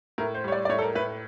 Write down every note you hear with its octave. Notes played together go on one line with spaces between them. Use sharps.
A2 A#4
C5
G3 C#5
D5
D5
A2 C#5
A4
A#4
A2 B4